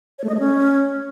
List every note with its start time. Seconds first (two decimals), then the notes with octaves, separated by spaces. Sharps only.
0.19 C#5
0.24 A3
0.29 D#5
0.34 A3
0.40 C#4